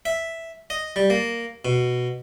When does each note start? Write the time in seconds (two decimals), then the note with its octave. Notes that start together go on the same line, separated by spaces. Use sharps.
0.05 E5
0.70 D#5
0.96 G3
1.10 A#3
1.65 B2